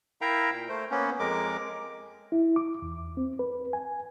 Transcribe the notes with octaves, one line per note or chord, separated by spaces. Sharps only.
E4 A#4 E5 F5 G5 A#5
A#2
A3 C5
A#3 B3 C#4
F2 G#3 A#4 D6
E4
D6
E2
C4
B4
G#5